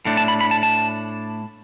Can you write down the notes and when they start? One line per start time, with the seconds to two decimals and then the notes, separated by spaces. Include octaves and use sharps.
0.05 A2 A3 D4
0.17 A5
0.28 B5
0.41 B5
0.51 A5
0.63 A5